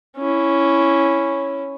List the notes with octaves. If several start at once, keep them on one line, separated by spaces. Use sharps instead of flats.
C#4 E4